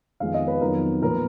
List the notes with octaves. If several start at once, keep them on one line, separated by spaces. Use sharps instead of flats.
F2 D#3 G#3 B3 F5
D#5
B4
F2 D#3 F#3 B3 A#4
A#2 F3 B3 A#4